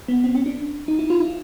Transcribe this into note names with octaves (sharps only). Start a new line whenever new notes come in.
B3
C4
C#4
D4
D#4
E4
F4
E4